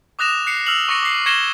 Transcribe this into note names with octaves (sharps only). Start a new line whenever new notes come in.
D6 D#6 F#6 A#6 E7 F7
F#6 C7 C#7
E6 F6 F7 F#7
C#6 D6 A#6 C#7
D6 C7
C#6 G#6 A#6 C#7 E7 G7